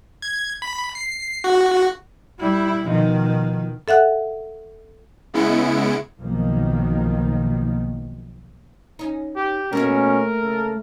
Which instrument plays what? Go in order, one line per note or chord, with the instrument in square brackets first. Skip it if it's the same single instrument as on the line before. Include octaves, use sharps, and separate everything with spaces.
[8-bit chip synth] G#6
B5
C7
F#4
[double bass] G3 E4
[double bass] B2 D#3 [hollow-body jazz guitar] F3 D#4
[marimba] A4 E5 F#5 F#6
[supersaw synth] C#3 G#3 B3 E4 C#7 D7
[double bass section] B1 B2 D#3 F3 A#3
[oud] C#4 D#4
[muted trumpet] G4
[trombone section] B2 C#4 [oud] A3 A#3 [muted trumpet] A#4
[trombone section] C#3 A4